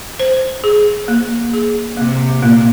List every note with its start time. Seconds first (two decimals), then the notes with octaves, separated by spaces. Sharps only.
0.20 C5
0.64 G#4
1.08 A#3
1.53 G#4
1.97 C3 A#3
2.42 A#2 A#3